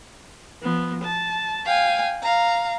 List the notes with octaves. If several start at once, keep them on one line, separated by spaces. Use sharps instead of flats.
F3 B3
A5
F5 G5 G#5
F5 A#5